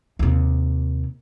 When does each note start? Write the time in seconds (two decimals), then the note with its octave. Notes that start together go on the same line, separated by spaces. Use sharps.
0.19 D#2 C3